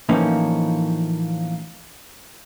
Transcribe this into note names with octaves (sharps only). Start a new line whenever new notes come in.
A2 E3 F3 A#3 C#4 D#4